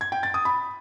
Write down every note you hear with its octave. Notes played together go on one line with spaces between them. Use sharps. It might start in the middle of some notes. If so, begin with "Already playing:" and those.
G#6
G5
A6
D#6
B5